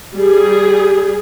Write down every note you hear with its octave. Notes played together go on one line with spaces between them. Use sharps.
G3 G#4